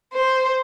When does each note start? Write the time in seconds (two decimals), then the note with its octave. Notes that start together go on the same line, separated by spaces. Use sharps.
0.13 C5